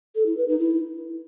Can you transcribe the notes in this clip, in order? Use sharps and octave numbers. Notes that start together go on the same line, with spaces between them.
A4
E4
B4
D#4
E4